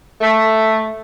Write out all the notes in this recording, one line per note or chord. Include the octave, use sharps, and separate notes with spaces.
A3